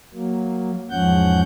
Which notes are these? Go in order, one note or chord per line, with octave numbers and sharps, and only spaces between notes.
F#3 A#3
E2 G#2 F3 C#4 F#5 G6